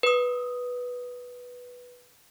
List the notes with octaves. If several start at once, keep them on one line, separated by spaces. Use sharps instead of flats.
B4 D#6